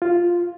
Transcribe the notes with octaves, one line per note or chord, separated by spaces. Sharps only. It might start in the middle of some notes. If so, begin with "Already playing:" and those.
F4